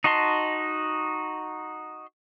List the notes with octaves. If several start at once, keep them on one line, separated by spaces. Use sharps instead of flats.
D#4 F#4 D#5 A5 C6